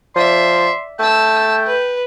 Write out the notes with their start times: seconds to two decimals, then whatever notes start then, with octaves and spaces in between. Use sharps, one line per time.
0.16 F3 D5 E5 C6
1.00 A3 G5 A5 E6
1.66 B4